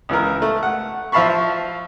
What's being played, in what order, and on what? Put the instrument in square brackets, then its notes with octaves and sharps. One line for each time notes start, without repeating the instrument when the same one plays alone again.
[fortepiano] C#2 E3 A#4
A3
F#5
F3 E5 F5 A5 B5 C#6